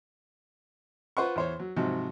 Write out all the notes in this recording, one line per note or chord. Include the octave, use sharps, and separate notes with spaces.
F4 B4 C5 F#5 C#6
E2 C5 C#5
F#3
G#2 C3 F3 F#3